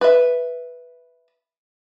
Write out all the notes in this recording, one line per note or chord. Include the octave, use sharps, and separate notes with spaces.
B4 E5